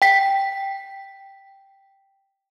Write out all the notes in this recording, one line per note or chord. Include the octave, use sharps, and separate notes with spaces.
G5 B6